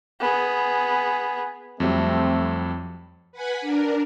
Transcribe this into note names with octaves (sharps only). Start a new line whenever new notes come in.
B3 G#4
F2 F#3 G3 A3 C4
B4 F#5 G#5 B5
D4 A#4